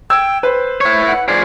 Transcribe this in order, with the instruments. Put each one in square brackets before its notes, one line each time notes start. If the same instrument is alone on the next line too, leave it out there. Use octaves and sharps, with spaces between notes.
[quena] G5 [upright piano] E6 G#6
[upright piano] B4 [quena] C5
[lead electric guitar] E4 C#5
[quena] F#5
[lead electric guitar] F3 G#4 [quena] D5